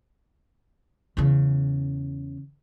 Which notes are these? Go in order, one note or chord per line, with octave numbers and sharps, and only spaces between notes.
E2 C#3